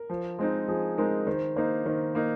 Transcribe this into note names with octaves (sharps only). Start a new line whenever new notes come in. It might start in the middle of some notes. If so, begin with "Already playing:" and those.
Already playing: A#4
F3
G#3 C4 D#4
F3 G#4
G#3 C4 D#4 A#4
D#3 C5
A#3 D#4 C5
D#3 C5
A#3 D#4